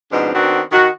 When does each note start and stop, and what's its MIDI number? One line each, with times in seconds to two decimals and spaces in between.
0.11 0.31 44
0.11 0.31 47
0.11 0.31 53
0.11 0.31 60
0.11 0.31 62
0.34 0.60 51
0.34 0.60 59
0.34 0.60 60
0.34 0.60 62
0.34 0.60 66
0.71 0.87 51
0.71 0.87 66